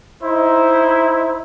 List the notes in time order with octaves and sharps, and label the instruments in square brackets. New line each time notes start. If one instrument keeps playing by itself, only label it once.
[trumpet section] D#4 E4 C5